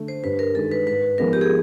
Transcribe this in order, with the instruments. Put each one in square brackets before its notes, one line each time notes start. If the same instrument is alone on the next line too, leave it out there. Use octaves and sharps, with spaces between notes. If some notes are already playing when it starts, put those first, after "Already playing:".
Already playing: [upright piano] D3 A3
[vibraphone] C5
[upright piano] G2 [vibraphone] B4
[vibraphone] A#4
[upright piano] D#3 G#3 [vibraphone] A4
[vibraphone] B4
[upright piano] G#2 [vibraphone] B4
[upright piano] F3 G#3 B3 D#4 [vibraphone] A#4
[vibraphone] G4
G#4